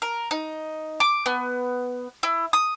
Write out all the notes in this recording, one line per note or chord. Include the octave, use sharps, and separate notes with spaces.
A#4
D#4
D6
B3
E4
D#6